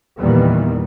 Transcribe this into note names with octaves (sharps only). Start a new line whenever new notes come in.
E2 A#2 D#3 E3 G3 B3